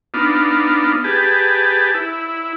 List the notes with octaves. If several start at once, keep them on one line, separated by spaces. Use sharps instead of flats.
B3 D4 D#4 F4
G4 G#4 B4 A5
E4